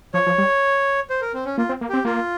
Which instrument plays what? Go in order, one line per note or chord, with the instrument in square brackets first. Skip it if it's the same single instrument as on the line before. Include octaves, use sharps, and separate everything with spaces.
[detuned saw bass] F3 [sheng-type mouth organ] C#5
[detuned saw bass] F3
G3
[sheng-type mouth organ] C5
A#4
C4
C#4
[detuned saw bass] A#3 [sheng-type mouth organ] F4
[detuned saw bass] C4
A#3
[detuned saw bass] C4 [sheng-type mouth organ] G4
[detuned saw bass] A#3 [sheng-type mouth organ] F4